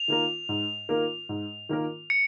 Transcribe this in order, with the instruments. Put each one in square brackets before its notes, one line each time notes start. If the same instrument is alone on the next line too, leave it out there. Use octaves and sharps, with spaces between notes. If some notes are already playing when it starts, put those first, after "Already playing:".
Already playing: [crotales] F7
[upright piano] D#3 A#3 F4 A#4
G#2
D#3 A#3 F4 A#4
G#2
D#3 A#3 F4 A#4
[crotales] C#7